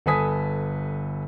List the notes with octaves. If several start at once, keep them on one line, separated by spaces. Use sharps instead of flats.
G1 A4 B4 G#5 D#6 B6